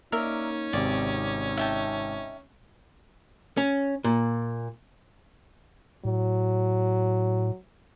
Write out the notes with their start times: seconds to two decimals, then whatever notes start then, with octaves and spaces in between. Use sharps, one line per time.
0.12 A#3 C#4 D#4 A#4 D5 E5
0.73 G#1 C3 D5
1.57 E5 G5 A5
3.57 C#4
4.04 A#2
6.05 A2 F#3